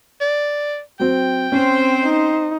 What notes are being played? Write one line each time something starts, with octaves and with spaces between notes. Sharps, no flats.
D5
F#3 C4 G5
C4 C#4 C5
D#4